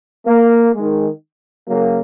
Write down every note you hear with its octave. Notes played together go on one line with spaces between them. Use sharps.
A#3
D#3 G#3
C#3 F#3 A#3